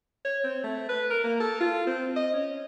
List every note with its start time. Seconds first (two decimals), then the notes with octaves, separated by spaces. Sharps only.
0.25 C#5
0.44 C4
0.64 A3
0.89 B4
1.10 A#4
1.24 A#3
1.40 A4
1.60 F4
1.87 C4
2.16 D#5
2.33 C#4